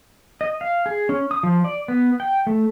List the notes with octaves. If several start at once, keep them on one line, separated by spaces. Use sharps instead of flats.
D#5
F5
G#4
C#4
D#6
F3
D5
B3
G5
A3